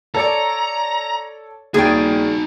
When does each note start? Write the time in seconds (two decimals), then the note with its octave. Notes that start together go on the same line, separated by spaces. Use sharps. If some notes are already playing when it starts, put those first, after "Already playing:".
0.15 A4 C#5 D5 A#5
1.74 D#2 D#4 F#4 G#4 D5 G5